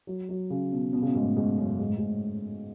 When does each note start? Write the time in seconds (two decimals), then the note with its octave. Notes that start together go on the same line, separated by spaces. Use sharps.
0.07 F#3
0.29 F#3
0.50 C#3
0.72 B2
0.93 B2
1.02 C#3
1.07 B2
1.15 G#2
1.22 A2
1.37 G#2
1.58 F#2
1.79 G#2
1.89 A2
1.98 G#2